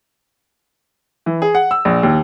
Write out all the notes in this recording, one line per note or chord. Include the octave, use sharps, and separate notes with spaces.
E3
G#4
F#5
E6
A#1
D#2